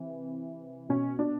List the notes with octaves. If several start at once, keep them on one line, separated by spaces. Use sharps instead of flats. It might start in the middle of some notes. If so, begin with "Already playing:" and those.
Already playing: C3 E3
B2 C#4
D4